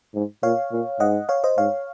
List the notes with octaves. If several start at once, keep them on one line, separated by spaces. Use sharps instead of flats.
G#2
A#2 C#5 F5
A#2
G#2 D#5 F#5
C#5 F5
C5 D#5
G#2 C#5 F5